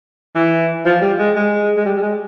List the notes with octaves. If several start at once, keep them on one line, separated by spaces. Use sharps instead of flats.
E3
F3
G3
G#3
G#3
G#3
G3
G3
G#3